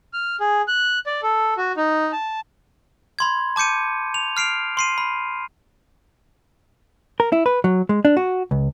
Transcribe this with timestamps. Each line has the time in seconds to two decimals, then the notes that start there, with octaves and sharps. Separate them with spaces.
0.13 F6
0.40 G#4
0.68 F#6
1.06 D5
1.23 A4
1.57 F#4
1.77 D#4
2.13 A5
3.19 B5 C6 G#6
3.56 A5 D6 G6 C#7 D#7
4.14 F7
4.37 F6 C7 D7 F7
4.77 C6 C7 D#7
4.98 B5
7.20 A#4
7.32 E4
7.46 B4
7.64 F#3
7.89 G#3
8.05 D4
8.17 F#4
8.51 C#2